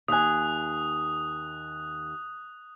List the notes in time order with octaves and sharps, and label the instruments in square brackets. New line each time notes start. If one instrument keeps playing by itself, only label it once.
[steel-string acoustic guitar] D#2 G#5 [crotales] D#6 F#6